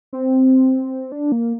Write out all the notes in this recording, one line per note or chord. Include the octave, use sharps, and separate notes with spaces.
C4
D4
A#3